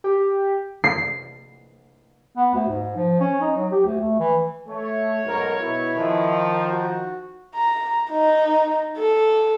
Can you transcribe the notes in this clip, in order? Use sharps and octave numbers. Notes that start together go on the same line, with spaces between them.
G4
C7
B3
D2
G#2
F3
C#4
D#4
F#3
G4
D2
A3
E3
A3 C#5
B1 G#2 A#4
B2 E4
D#3 F3 B3 G#4 A4
G5 A5 A#5
F#4
A#5
D#4
A4